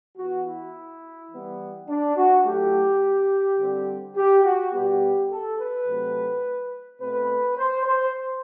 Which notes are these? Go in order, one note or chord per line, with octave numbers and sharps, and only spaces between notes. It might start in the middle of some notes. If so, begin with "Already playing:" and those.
E3 B3 F#4
E4
E3 G3 B3
D4
F#4
A2 F#3 A3 G4
D3 G3 C4
G4
F#4
B2 G3 B3 G4
A4
B4
C3 F#3 A3 C4
B2 A3 C4 B4
C5
C5